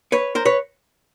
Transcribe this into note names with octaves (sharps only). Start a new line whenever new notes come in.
B4 C#5
A#4 C5
B4 C#5